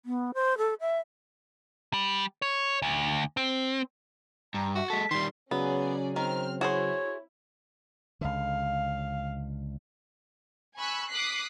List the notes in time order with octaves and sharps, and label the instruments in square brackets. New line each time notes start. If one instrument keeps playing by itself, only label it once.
[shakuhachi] B3
C5
A4
E5
[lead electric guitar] G3
C#5
D2
C4
[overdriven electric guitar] G2 [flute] A#5
[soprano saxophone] F#4 [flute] E5
[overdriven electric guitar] G#3 A4 [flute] B6
[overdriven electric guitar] D#3 G3 [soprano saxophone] C6
[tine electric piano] C#3 F#3 [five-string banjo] B3 [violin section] C#4 G#4 D5
[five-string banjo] D#3 [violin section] C4 F6
[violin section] E4 [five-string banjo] F#4 G#4 C5 [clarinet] C#5
[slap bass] C#2 D3 [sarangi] F5
[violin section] G#5 B5 C#6 E6 F#6
D6 D#6 F#6 B6 C7